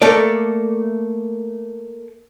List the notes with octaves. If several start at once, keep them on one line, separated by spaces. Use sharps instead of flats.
A3 A#3 A4 D5